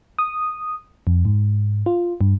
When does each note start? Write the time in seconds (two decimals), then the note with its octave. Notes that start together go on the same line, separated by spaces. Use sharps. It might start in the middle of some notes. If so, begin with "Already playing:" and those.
0.19 D#6
1.07 F2
1.25 G#2
1.86 F4
2.21 G2